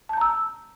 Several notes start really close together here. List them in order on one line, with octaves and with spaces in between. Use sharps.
A5 G6 A#5 E6